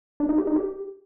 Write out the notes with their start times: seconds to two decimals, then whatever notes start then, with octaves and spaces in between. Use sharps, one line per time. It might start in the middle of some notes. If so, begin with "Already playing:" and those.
0.20 D4
0.29 D#4
0.38 G4
0.47 D#4
0.56 G4